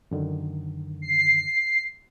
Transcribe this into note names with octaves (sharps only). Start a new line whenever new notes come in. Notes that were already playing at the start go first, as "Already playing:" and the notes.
F#2 D3 D#3
C7